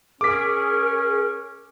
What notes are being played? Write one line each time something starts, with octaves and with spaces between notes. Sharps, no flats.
C#4 G#4 A#4 D6 B6